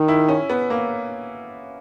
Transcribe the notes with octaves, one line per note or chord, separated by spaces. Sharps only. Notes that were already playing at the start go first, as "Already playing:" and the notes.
Already playing: D#3
E4
C#4
B3
A#3